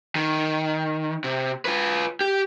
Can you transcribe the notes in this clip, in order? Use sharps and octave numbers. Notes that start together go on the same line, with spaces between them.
D#3
C3
F4 B4
G4